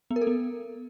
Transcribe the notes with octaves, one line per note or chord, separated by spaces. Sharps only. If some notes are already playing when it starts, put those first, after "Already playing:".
B3
A#4
A4
B3